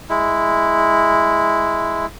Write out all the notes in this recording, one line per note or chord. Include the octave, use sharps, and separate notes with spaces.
G#3 E4